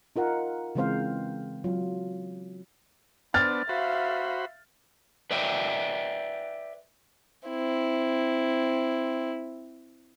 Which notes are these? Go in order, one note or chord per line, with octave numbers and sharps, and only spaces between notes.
D#4 F4 A#4 F#5
C#3 E3 G#3 C4 C5 F5
F#3 F4
B3 D4 C5 F6 A6
F#4 C5 E5 F5 B5
B4 D5 E5 G5
C4 E4